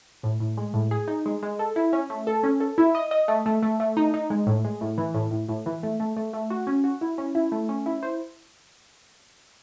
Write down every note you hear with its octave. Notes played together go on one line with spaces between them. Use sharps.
A2
A2
G#3
A2
G#4
D#4
G#3
G#3
A4
E4
C#4
A3
A4
C#4
A4
E4
D#5
D#5
A3
A3
A3
A3
D#4
D#4
G#3
A2
G#3
A2
E3
A2
A2
A2
E3
A3
A3
A3
A3
F#4
C#4
F#4
E4
C#4
E4
A3
C#4
E4
C5